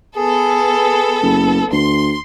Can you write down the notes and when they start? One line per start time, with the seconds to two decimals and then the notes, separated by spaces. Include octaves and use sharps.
0.17 B3 G#4 A4
1.22 F#1
1.72 D2 C6